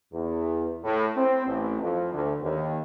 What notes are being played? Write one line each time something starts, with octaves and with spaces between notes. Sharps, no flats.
E2
A2
C4
A1
F2
D2
D#2